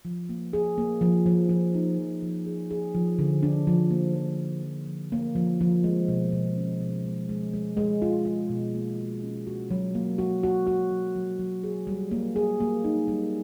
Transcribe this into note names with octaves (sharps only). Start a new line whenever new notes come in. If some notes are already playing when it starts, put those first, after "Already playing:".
F3
A#3
G#4
A#3
F3
F3
F3
D#4
F3
F3
G#4
G#4
F3
D3
D4
F3
A#3
F3
D4
F3
F3
A#3
F3
F3
G#3
B2
B2
C#4
B2
G#3
G#3
G#3
G#3
F4
F4
B2
A#3
F#4
C#4
F#4
F#3
A#3
F#4
F#4
F#4
F#3
F#3
F#3
G#4
G3
A#3
G#4
A#3
D#4
G3